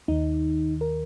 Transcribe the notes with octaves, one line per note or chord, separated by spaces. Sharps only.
D#2 D#3 D#4
A#4